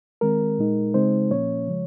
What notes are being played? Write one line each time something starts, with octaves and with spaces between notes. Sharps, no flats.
D#3 G#3 C4 A#4
A#2 G#3 D#4
C#3 G#3 C4 D#4 C5
A#2 F3 A#3 C#4 C#5
C#3 F3 G#3